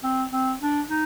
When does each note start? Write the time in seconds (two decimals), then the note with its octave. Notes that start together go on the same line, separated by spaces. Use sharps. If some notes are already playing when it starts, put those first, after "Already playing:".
0.03 C4
0.33 C4
0.61 D4
0.90 D#4